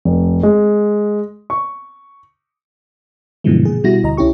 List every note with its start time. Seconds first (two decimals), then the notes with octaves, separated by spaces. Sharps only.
0.05 F1
0.43 G#3
1.50 C#6
3.44 G2 B2 D3 E3 F3 G#3
3.63 A#2 G#4
3.84 B2 G3 E4 F#4 A#6
4.04 D2 D#5 A#5
4.17 C2 C#4 E4 G4 C#6